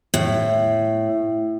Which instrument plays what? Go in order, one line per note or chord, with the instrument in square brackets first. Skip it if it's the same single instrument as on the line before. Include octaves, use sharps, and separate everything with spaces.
[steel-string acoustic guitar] A2